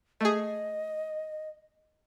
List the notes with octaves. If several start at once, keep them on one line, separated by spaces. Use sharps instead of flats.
A3 G#4 D#5